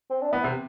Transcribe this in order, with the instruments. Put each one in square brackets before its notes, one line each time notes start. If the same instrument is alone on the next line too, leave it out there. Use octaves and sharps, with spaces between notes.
[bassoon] C4
D4
[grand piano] B3 [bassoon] E4
[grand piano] C3 C4